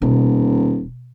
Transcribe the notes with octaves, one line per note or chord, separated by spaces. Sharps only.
D#1 B2